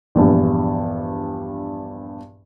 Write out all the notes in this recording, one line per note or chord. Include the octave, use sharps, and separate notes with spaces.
A#1 E2 G2